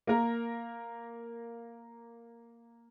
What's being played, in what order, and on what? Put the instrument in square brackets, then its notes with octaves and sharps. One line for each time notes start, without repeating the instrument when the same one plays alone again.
[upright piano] A#3 A#4